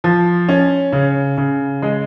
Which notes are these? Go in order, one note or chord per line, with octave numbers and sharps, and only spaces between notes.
F3
C#4
C#3
C#3
G#3